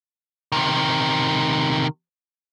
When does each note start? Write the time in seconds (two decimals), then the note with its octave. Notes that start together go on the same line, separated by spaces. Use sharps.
0.52 C3 D#3